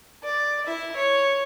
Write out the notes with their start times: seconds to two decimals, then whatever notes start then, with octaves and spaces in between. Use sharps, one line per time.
0.24 D5
0.66 E4 E5
0.96 C#5